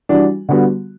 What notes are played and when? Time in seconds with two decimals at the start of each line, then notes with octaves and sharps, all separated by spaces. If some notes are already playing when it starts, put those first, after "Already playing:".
0.09 E3 G3 D4 F#4
0.49 D3 G3 B3 F#4